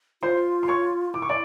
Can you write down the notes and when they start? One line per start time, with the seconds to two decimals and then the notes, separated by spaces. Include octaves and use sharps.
0.22 F4 C5 C6
0.63 C6
0.68 C#5 C#6
1.14 E4 D6
1.22 C#6
1.29 D5 D6